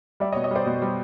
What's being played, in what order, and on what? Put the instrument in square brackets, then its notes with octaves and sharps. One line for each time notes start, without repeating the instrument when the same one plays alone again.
[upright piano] G3 D5 E5
C#5 D#5
B2
C#5 D#5
G3 C5 D5
B2
G3